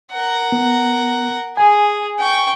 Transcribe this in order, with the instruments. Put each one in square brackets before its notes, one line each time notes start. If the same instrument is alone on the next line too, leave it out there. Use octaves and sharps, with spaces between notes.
[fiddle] A#4 F#5
[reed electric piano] B3
[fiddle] G#4 [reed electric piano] G#5
[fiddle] G5 C#6